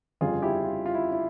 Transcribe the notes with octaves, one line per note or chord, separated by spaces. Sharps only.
G1 F2 C#3 G3 F4 G#4
E4 G4
F4
F4
E4
E4